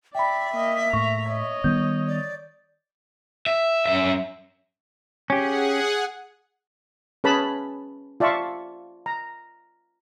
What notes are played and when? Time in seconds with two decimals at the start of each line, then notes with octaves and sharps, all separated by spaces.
0.15 D5 E5 G5 B5
0.54 A#3 D#5
0.93 A2 A#5 C#6
1.28 C#5 D#5
1.64 D#3 G3 B3 G6
2.08 D5
3.46 E5
3.86 F#2 E5
5.30 C#4 G4 G#4 F#5
7.24 C#4 G#4 B4 A5 B5
8.20 F4 D5 E5 A5 C#6
9.06 A#5